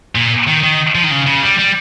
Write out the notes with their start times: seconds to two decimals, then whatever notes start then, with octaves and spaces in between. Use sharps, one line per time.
0.15 A#2
0.48 D#3
0.63 D#3
0.95 F3
1.04 D#3
1.11 C#3
1.26 C#3
1.43 G3
1.59 G3